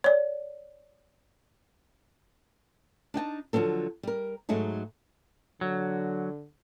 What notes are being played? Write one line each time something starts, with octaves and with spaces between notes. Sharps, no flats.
C#5 D5
D4 D#4 G5 A5
D3 F3 F#3 C4 A4
G3 A#4
G#2 F#3 G#3 A3 D#4
D3 F#3